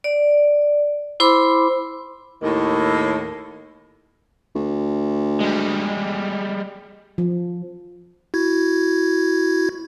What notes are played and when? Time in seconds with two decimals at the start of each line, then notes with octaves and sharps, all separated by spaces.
0.04 D5
1.20 E4 C5 B5 C6 D6
2.42 D#2 A2 D#3
4.55 D2
5.40 G3 G#3
7.18 F3
8.34 E4 F#4 G#6